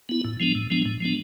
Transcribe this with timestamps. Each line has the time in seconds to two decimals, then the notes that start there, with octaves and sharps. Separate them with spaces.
0.09 B3 E4
0.25 A2
0.40 F3 G#3 B3 D4
0.55 A2
0.70 F3 G#3 B3 D4
0.85 A2
1.01 F3 G#3 B3 D4